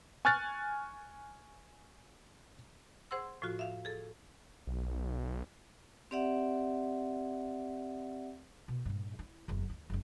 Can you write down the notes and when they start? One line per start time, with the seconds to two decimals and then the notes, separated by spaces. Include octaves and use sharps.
0.25 G#5 C#6 F6 F#6 A6
3.11 G#4 C5 F#5 C6 E6
3.42 A2 F3 F4 F#4
3.59 E5 F5
3.85 G#4 A4
4.67 B1
6.11 C4 G4 D5 E5 F#5
8.68 B2
8.85 G2 A#2
9.19 E4
9.48 F#1 E2
9.70 D#2
9.90 F#1 C#4